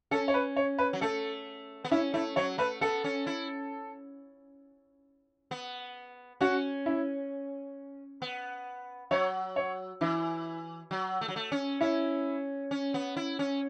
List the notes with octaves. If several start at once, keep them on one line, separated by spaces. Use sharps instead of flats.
C#4 A4
C#5
B4
C#5
B4
F#3
A3 A4
B3
C#4 E4
A3 E4
F#3 C#5
A3 B4
B3 A4
C#4
E4
B3
C#4 F#4
E4
B3
F#3 C#5
C#5
E3 E4
F#3
A3
F#3
A3
C#4
C#4 E4
C#4
B3
E4
C#4